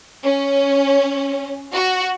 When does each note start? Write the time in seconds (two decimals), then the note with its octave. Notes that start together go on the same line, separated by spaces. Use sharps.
0.24 C#4
1.73 F#4